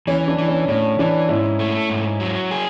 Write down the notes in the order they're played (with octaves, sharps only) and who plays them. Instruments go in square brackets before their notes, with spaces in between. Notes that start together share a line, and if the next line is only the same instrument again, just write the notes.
[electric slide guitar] E3 [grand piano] C#4
[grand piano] D4
[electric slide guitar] E3
[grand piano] C#4
[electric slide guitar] A2 [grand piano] C#4
[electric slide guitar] E3 [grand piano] D4
[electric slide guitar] G#2 [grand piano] C#4 E4
[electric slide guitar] A3
G#2
F#3
G#4